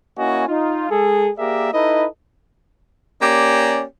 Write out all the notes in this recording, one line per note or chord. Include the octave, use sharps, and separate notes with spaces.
A#3 C#4 E4 F#4 D#5 G#5
D#4 F4
G#3 G#4 A4
A#3 G4 G#4 A#4 D5 E5
D#4 E4 A4 B4 D#5
A#3 C#4 G4 D5